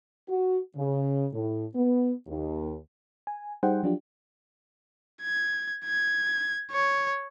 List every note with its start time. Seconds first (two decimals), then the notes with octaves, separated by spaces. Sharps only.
0.27 F#4
0.75 C#3
1.32 A2
1.74 B3
2.27 D#2
3.27 G#5
3.63 G3 D#4 G#4 C5 F#5 G5
3.83 F3 F#3 D4 F4 G4
5.22 G#6
5.85 G#6
6.72 C#5